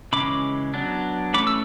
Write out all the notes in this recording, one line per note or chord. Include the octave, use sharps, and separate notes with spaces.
C#3 E3 G#3 C#4 B5 D6
F#3 B3 D4
E3 A3 C#4 B5 D6
E6